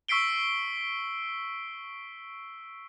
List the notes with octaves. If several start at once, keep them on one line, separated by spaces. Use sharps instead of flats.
C#6 E6 B6 C7 D7 G7